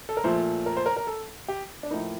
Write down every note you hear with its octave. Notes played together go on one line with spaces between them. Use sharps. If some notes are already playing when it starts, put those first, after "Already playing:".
A4
A#4
A#2 F3 A3 C5
A#4
C5
A#4
A#4
A4
G4
D4
A2 F3 A#3 D#4